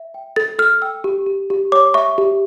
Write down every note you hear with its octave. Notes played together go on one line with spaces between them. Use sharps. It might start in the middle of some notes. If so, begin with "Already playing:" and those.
Already playing: E5
G5
A4 A6
A4 F6
G5 E6
G4
G4
G4
C#5 D6
E5 C#6
G4